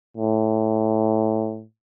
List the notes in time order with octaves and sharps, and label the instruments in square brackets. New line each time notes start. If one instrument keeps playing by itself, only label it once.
[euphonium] A2